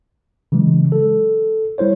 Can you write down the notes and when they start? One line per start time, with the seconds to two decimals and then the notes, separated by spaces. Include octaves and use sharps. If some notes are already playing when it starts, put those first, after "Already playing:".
0.52 C#3 E3 F#3 G#3
0.92 A4
1.78 G3 E4 C5 C#5